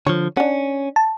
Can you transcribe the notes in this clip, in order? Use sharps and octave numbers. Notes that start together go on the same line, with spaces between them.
D3 F3 C#5
C#4 D4 F#5
A5